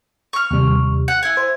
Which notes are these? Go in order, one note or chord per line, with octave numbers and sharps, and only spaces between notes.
C#6 F6
D#2 C3 G3
F#5 C#7
E4 G#5
C5